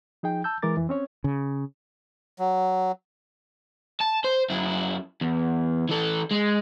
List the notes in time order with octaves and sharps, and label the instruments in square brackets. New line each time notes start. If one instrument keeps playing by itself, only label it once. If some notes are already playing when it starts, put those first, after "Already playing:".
[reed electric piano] F3 D#4 G#4 G5
A5 E6 G6
E3 G#3 A#4 D6 A6
F2 E3
C4 C#4 C#5
[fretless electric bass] C#3
[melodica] F#3
[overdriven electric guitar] A5
C5
F#2 E4
E2
E3 A4
G#3